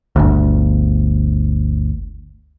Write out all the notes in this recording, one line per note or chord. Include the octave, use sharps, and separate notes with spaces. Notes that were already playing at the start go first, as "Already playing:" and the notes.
G1 D2